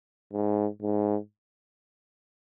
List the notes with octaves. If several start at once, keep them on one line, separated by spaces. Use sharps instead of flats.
G#2
G#2